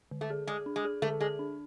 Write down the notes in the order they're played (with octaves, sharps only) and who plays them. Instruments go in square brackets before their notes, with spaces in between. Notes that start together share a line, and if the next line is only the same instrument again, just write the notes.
[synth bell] D3
[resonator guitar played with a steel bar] A3
[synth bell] G#4
[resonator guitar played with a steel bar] G#3 [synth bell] G#4
[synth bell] D4
[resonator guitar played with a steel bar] G#3
[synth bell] G#4
[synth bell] D3 [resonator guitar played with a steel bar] A3
[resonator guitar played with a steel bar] G#3 [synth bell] G#4
[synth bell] D4